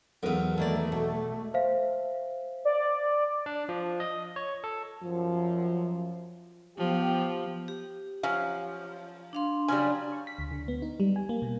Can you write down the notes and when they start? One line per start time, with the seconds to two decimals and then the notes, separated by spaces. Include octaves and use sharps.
0.23 B1 E2 A#4 B4 F5
0.58 D#3 A3 A#3 D5
0.92 B2
1.54 C5 E5 F5
2.65 D5
3.46 D4
3.69 F3
4.00 D#5
4.36 C#5
4.64 A4
5.03 F#2 F3
6.78 F3 B3 G4 G5
7.68 G4
8.23 F3 F#3 C#4 F5
9.33 D4 F5 C6
9.68 C#3 F#3 G3 G#5
10.12 C#6
10.27 B6
10.39 D2
10.51 D3
10.68 B3
10.82 D#4
11.00 G3
11.16 G#5
11.29 A#3
11.42 B2